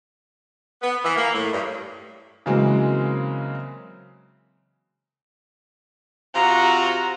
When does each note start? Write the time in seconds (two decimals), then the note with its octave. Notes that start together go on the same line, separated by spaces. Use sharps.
0.82 B3
1.04 E3
1.16 A#3
1.34 A2
1.52 G2
2.46 C#3 E3 F#3 G#3 A#3 C4
6.35 C3 F4 F#4 A#5